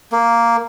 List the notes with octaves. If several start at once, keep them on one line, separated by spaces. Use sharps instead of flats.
A#3